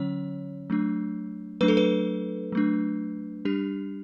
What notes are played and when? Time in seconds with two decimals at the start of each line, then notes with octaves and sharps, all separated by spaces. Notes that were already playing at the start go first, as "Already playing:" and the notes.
Already playing: D3 F#3 C#4 C#5
0.70 F#3 A3 D4
1.61 F#3 A3 D4 B4
1.68 A4
1.77 B4
2.52 F#3 A3 D4
3.45 G3 D4 G4